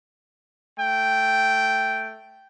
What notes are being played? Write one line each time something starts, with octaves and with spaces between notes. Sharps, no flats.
A3 G5